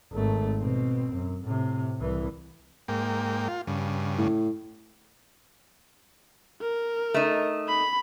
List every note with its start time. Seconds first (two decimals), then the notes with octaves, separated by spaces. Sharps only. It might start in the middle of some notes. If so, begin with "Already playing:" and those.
0.13 G#1 A3
0.60 B2 C4
1.13 F#2
1.44 A2 C3
2.00 C2 E3
2.88 G#2 A#3 G5
3.48 F4
3.67 G2 C#3
4.18 A2
6.61 A#4
7.14 A3 D#4
7.68 B5